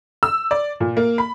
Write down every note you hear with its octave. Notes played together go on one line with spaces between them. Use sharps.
E6
D5
A#2
A#3
B5